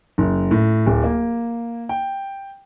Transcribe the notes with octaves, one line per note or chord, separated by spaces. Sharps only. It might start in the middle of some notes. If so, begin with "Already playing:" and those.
F#1
A2
D1
A#3
G5